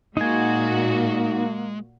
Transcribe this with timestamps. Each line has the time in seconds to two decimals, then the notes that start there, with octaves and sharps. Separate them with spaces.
0.17 A#2 G#3 A#3 D#4 F#4 G#5